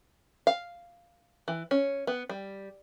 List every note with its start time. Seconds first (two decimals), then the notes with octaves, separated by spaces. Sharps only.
0.47 F5
1.48 E3
1.71 C#4
2.07 B3
2.29 G3